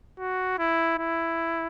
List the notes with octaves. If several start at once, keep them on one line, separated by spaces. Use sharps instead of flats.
F#4
E4
E4